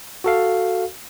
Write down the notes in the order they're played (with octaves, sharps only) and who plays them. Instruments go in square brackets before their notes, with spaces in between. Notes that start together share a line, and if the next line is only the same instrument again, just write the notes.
[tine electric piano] F#4 A4 F5